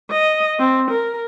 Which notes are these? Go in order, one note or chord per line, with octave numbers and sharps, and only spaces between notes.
D#5
C4
A#4